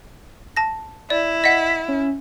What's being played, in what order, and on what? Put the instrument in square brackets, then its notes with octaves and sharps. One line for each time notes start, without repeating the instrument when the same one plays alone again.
[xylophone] A5 A#6
[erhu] E4 [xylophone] D5
[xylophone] D#5 F#5 [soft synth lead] B6
[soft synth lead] C#4